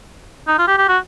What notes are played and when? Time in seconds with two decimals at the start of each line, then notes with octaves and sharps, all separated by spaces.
0.47 D#4
0.58 F4
0.67 G4
0.78 G4
0.88 F#4